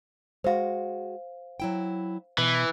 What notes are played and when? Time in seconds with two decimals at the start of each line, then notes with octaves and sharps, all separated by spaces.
0.44 G#3 F#4 C5 F5
1.60 F#3 E4 G5
2.38 B2 E3